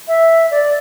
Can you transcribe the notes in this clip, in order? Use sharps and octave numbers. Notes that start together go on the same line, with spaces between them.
E5
D5